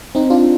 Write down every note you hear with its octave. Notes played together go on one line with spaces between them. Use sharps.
C4 D#4
D4 F4